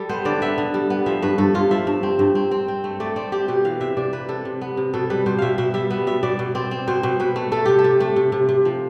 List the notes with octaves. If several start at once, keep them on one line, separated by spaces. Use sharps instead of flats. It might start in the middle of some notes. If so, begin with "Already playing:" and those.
Already playing: G3 A4
B3 C5
D3 D5
B3 E5
D3
G3
B3
F3 E5
G2 B4
G2 A4
G2 F4
F3 E5
G2
C4
G2
C4
C4
C4
A3
A3 D5
C4 D5
C4 G4
B2 G4
E3 F5
C3 E5
C3 D5
C3 B4
C3 A4
C3
B3
C3
B2 A4
G3 B4
B2 C5
B2 E5 F5
B2 E5
G3 E5
B3 E5
B2 E5
B2 D5
B2
C4 D5
C4
B2 C5
B2
B2 B4
A3
A3 A4
C3 G4
A4
C3
A3
C3
C3
C3
F3